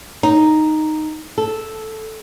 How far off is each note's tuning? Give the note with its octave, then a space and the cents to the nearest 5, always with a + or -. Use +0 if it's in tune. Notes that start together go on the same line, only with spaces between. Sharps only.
D#4 -5
A4 -5